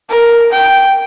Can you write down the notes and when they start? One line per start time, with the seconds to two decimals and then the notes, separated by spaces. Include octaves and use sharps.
0.11 A#4
0.52 G5